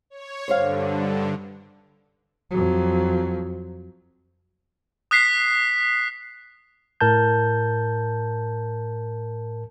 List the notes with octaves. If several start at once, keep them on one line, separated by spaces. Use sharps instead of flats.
C#5
G2 D3 C5 C#5 F5
F2 F#3
D#6 F#6 B6 C7
A2 A#4 A5 G6